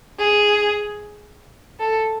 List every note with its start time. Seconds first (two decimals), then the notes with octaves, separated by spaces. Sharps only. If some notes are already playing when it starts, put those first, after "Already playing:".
0.19 G#4
1.79 A4